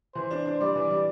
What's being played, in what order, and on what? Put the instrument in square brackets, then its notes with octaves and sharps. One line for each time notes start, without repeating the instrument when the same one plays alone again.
[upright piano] E3 [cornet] C5
[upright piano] D4
D4
[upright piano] G3 [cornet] D5
[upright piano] E3
G3